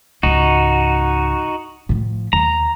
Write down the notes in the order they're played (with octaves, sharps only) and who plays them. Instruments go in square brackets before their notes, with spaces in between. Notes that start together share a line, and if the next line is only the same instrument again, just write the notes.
[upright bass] C#2 G#2 [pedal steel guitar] D#4 F#4
[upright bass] A2 F3
[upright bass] D#2 [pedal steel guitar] A#5